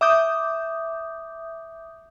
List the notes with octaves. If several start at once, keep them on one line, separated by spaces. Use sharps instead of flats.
E5 D6 D#6 G6